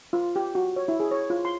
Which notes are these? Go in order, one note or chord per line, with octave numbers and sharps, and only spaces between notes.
F4
G4
F#4
C#5
E4
G#4
C#5
F4
C6